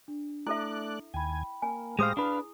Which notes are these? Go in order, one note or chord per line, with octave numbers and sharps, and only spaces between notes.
D4
A3 E4 A4 D5 E5 F#6
D#2 G5 G#5 B5
A#3 G#5
A2 G#3 G4 G#4 C5 F5 D#6 A#6
D4 E4 B4 F5